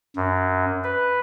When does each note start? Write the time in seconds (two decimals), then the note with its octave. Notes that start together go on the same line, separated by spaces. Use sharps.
0.16 F#2
0.84 B4